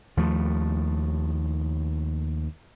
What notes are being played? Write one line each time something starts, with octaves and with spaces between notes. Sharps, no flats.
D#2 F3 A3